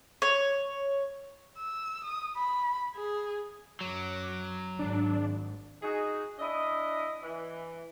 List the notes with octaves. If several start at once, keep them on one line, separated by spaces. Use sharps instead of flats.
C#5
E6
D#6
B5
G#4
F#2 F#3 D6
G#1 D4
D#4 F#4 G#4
D4 E4 D#5
E3